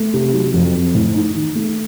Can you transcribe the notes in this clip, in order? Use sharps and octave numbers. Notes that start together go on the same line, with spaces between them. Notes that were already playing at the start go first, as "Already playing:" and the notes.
Already playing: A3
C3
F#3
F2
C4
A2
D#4
D#3
A3